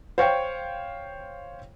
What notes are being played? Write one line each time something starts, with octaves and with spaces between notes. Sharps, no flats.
C5 C#5 F5 G5